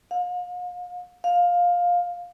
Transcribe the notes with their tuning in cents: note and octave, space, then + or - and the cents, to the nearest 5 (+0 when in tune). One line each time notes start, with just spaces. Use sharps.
F5 +40
F5 +15